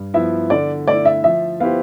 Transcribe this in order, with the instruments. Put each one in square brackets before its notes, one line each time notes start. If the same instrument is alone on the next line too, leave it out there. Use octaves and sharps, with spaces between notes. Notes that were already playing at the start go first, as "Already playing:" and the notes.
Already playing: [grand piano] G2
[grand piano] F3 B3 E4 [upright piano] E5
[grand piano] D3 [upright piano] D5
[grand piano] A3 E4 [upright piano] D5
[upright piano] E5
[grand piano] F3 [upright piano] E5
[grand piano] B3 E4 G4 C5 [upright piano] F5